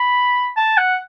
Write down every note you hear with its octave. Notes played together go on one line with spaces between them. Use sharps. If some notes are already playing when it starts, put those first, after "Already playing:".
Already playing: B5
A5
F#5